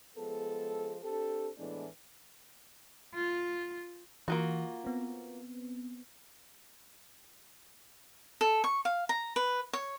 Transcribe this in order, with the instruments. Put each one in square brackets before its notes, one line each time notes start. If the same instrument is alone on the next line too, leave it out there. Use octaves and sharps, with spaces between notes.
[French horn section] F3 G#3 B3 G#4 A4
C4 D4 G4 A4
A2 E3 G#3 A3 B3 D4
[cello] F4
[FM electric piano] E3 [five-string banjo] A#3 F4 F#4
[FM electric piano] B3 C4
[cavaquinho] A4
C#6
F5
A#5
B4
C#5